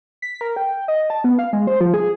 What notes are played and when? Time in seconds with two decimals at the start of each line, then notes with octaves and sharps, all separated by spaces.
0.22 B6
0.41 A#4
0.56 G5
0.88 D#5
1.10 A5
1.24 B3
1.39 F5
1.53 G#3
1.67 C5
1.81 F3
1.94 G#4